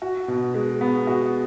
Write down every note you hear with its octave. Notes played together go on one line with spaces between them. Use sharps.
F#4
B2
G#3
B3
F#4